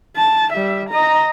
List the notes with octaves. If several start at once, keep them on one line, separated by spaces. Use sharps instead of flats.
A5
G3 E5
D#5 A#5